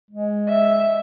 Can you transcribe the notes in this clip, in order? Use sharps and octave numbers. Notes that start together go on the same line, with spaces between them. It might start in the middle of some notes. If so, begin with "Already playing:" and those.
G#3
E5